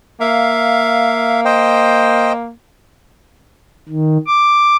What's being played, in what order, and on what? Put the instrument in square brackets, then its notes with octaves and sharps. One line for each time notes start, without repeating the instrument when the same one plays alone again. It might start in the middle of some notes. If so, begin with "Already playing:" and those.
[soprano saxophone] A#3 [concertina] E5 F5
[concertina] C5 D#5 G5
[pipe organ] D#3
D6